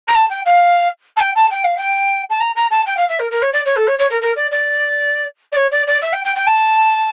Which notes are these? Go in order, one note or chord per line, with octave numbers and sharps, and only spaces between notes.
A#5
A5
G5
F5
A5
G5
A5
G5
F5
G5
A5
A#5
A#5
A5
G5
F5
E5
A#4
A#4
C#5
D5
C#5
A4
C#5
C#5
A#4
A#4
D5
D5
D5
C#5
D5
D5
E5
G5
G5
G5
A5